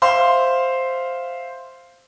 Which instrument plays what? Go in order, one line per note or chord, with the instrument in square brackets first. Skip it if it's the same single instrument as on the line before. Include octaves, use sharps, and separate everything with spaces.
[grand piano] C5 E5 F5 C6